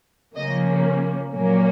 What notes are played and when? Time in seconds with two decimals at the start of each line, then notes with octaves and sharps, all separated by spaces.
0.35 C#3 F3 A#3 C#4 D#5
1.32 A#2 F#3 A#3 C#4